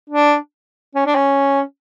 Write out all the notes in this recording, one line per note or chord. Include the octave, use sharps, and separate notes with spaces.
D4
C#4
D4
C#4